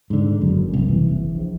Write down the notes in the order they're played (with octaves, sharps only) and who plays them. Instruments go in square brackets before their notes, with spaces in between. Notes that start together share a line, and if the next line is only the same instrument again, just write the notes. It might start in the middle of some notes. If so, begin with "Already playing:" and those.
[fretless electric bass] G#2 D3
[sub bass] F#1 [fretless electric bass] F#2
[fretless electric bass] F1 C2
E3
[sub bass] A#1